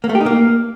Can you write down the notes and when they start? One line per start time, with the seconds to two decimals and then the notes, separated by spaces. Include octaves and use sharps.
0.04 A#3
0.09 A3
0.15 G4
0.21 D#4
0.26 A#3